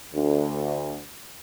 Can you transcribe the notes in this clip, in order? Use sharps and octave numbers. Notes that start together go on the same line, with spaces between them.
D2